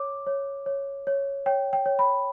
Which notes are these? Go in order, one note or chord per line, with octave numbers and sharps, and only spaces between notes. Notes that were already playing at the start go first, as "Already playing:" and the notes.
Already playing: C#5 D6
C#5
C#5
C#5
C#5 G5
G5
C#5
B5